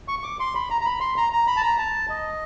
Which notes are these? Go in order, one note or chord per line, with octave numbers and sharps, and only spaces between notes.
C#6
C#6
D6
C6
B5
A#5
A#5
B5
C6
A#5
A#5
B5
A5
A#5
A5
D#5